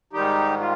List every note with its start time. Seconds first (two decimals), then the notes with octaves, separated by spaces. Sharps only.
0.13 G#2 D#3 G3 D#4 G4
0.60 F4